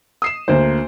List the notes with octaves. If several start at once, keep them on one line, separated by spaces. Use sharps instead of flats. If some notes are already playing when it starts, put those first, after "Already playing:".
D#6 C7 E7
D2 A#3 C5